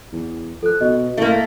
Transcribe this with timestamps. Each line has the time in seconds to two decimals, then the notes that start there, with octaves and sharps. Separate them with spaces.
0.12 E2
0.63 F3 A4 F#6
0.81 B2 D#5
1.17 A2 A3 A#3